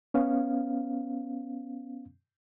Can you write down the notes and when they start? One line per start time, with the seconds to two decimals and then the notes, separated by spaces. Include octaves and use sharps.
0.14 B3 C#4 F5